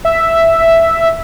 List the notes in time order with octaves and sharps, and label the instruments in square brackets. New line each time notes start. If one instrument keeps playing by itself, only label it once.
[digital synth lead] E5